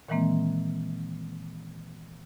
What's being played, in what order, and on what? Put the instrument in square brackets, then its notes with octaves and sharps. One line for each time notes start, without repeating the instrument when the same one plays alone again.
[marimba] A#2 D#3 E3 G#3 A#3 C4